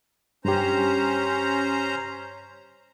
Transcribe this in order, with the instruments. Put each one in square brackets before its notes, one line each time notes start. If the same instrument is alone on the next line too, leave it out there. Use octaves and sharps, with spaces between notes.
[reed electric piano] G2 G4 [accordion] C#4 C5 A#5